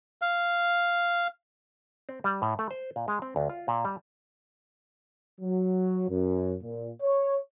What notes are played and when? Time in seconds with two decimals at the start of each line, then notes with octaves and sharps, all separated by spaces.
0.22 F5
2.09 C4
2.24 G3
2.42 A2
2.59 A3
2.71 C5
2.96 A#2
3.08 G#3
3.22 C4
3.36 D2
3.49 F4
3.68 A#2
3.85 G3
5.41 F#3
6.10 F#2
6.63 A#2
7.02 C#5